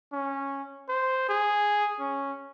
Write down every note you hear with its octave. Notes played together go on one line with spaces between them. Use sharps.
C#4
C5
G#4
C#4